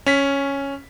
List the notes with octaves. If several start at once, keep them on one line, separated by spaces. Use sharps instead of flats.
C#4 B6